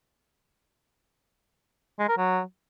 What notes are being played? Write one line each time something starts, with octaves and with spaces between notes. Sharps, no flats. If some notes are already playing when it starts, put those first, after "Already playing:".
G#3
A#4
F#3